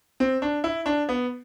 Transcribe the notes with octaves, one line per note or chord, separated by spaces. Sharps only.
C4
D4
E4
D4
B3